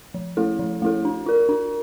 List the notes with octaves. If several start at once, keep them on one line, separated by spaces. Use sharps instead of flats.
F3
A3 E4 A4
F3
A3 E4 A4
D4
F4 A#4
D4